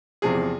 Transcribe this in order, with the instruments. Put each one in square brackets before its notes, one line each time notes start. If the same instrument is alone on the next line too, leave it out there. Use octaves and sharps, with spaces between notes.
[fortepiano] E2 C3 F3 G#4